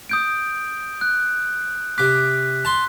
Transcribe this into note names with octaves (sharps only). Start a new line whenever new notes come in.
D#6 G6 D7
F#6
C3 D6 F#6 B6
A5 C6